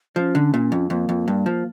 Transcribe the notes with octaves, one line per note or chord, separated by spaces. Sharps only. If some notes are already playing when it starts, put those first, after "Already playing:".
F3 C#4
D3
A#2
F2
F2 A#3
F2
G2
F3